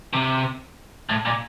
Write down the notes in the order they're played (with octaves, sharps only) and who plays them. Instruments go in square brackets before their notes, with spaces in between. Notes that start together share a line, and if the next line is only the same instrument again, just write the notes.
[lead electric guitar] C3
A2
A#2